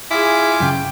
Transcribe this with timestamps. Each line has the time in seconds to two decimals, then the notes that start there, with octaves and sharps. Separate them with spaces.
0.11 E4 F4 G#4 G#5 D6
0.60 F#2 C#3 G5